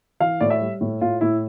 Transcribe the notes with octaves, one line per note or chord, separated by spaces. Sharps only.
E3 F5
A2 D5
E5
G3
A2
A2 F4
A2 E4